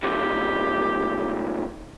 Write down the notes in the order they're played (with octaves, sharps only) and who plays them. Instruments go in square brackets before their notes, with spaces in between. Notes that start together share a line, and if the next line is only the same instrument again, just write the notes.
[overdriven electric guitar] C2 F#2 [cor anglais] G4